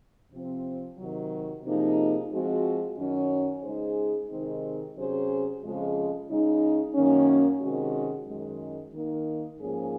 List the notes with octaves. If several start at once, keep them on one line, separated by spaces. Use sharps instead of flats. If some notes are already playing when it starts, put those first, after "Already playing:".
C3 F3 C4
C3 D#3 F#3
C3 F3 A#3 D#4 G#4
F3 G#3 C4 F#4
F#2 D#3 F#3 C#4
C#3 G#3 D#4 G#4 C5
C3 D#3 G#3 C4 D#4
C3 F#3 C#4 G#4 C5
F2 C#3 F3 G#3
C#3 G#3 D#4
F#2 D#3 A#3 C#4
C3 D#3 G#3 C#4 F#4
F#2 D#3 G#3
D#3 A#3 D#4 A#4
G#2 F3 A#3 C#4 G#4